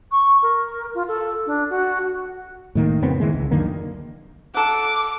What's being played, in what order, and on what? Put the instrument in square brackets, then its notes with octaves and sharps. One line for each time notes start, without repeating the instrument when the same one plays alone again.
[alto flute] C#6
A#4
F4
A4
D4
F#4
[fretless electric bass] A2 D#3 A#3
F2 C#3 B3 C4
D#3 E3 G#3
C#2
F#2 D3 D#3 A#3
[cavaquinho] A4 F#5 [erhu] D6